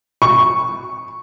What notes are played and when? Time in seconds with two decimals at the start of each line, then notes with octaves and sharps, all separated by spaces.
0.22 C#6